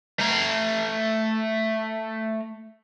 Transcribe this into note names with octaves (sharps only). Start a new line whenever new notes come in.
A3 A#5